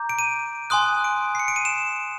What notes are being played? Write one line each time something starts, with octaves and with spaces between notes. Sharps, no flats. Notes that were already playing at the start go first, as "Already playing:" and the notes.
Already playing: A#5 D6 G6
D7
D#7
G#5 C6 D#6 F#6
D7
C7
C#7
D7
D#7
E7